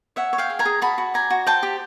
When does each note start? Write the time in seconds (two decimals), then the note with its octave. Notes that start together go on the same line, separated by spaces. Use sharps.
0.16 C#5 E5 F#5
0.33 C#5
0.38 F5 G5
0.50 G#4
0.59 G#5 A#5
0.65 G#4
0.82 F#4 A5 B5
0.98 F#4
1.14 D5 G#5 A#5
1.30 F#4
1.46 C5 G5 A5
1.63 G4